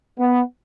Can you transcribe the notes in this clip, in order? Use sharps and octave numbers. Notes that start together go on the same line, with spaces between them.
B3